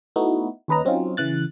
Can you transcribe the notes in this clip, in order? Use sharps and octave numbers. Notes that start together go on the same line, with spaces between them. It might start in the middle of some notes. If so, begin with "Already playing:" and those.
A3 B3 D#4 E4 F#4
D#2 C#4 B4 D#5 A#5
F#3 C4 C#4 D#4 F4
C#3 E3 F#6 A6